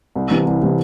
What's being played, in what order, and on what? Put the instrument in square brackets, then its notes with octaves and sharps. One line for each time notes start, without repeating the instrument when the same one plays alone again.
[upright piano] C2
C3 E3
C2
C3 E3